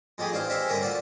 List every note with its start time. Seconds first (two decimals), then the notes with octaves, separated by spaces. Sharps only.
0.18 F2 G#3 G4 G#4 G#5
0.32 A1 D4 C5 F5
0.49 G#3 C4 G4 E5 F5
0.69 G2 D3 C#4 A#4 A#5
0.82 F4 F#4 D5